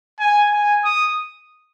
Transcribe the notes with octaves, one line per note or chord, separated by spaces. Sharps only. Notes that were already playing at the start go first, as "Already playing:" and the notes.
G#5
G#5
D#6